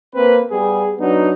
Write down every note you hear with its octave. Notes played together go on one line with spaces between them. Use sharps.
A#3 C4 B4
G3 B3 G#4
F#3 B3 D4 D#4